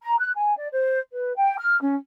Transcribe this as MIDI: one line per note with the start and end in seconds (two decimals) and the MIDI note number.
0.02 0.17 82
0.19 0.32 90
0.37 0.56 80
0.57 0.68 74
0.72 1.00 72
1.12 1.34 71
1.37 1.57 79
1.59 1.79 89
1.82 1.96 61